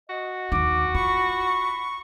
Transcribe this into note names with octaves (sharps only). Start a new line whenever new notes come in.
F#4 D#5
D#2 D#4 D6
F4 B5 C#6